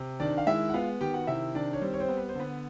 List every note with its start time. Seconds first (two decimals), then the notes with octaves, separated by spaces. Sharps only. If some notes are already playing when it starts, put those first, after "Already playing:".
Already playing: C3
0.20 D#3 D4 D5
0.38 F5
0.47 G#3 E4 E5
0.70 F#5
0.74 B3 F4 F5
1.00 D#3 G4 G5
1.14 F#4 F#5
1.27 C3 E4 E5
1.55 D#3 D4 D5
1.73 C#5
1.82 G3 C4 C5
1.93 C#5
2.00 C4 C5
2.09 B3
2.17 B4
2.29 C5
2.35 D3 B3 B4